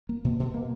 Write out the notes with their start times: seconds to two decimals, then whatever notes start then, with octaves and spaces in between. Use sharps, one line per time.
0.09 A#3
0.24 B2
0.39 B2
0.54 A#3